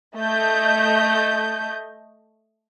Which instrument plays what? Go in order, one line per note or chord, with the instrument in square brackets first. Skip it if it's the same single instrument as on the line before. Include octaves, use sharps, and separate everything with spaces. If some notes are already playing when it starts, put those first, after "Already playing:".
[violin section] A3 D#5 G6